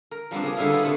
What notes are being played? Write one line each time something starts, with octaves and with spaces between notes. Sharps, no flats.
A#4
F3 G3 B3 C4 D4
C#3 A#3 G#4
D3 G3 D4 E4 F4 F5
B3 E4 F4 G#4
C3 A3 A4 C5 B5